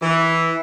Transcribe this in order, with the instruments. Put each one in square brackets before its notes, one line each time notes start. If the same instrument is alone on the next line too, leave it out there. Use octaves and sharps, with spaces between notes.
[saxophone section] E3